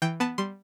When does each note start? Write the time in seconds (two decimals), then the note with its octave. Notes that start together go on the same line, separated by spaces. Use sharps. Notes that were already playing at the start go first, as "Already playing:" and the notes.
0.02 E3 G5
0.20 B3 A5
0.38 G3 C6